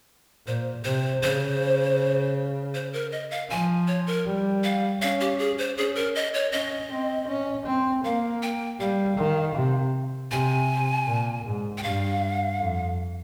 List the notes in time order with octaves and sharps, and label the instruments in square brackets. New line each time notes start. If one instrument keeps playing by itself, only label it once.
[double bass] A#2 [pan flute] C5
[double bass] C3 [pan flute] C5
[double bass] C#3 [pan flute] C5
[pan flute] C5
A#4
D#5
F5
[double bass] F3 [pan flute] G#5
[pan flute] C#5
A#4
[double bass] G3
[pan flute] F5
[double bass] C#4 [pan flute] F5
[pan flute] G4
G#4
C5
[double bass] C#4 [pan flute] G#4
[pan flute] A#4
D#5
C#5
[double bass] C#4 [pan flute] D#5
[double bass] C4
C#4
C4
[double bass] A#3 [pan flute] F5
[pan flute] G5
[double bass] G3 [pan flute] F5
[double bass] D#3
C3
[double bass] C3 [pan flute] G#5
[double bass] A#2
G#2
[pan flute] G5
[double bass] G2 [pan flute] F5
[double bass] F2